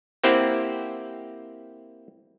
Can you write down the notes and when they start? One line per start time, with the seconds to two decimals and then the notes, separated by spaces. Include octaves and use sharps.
0.24 A#3 C4 E4 G4 C5 F#5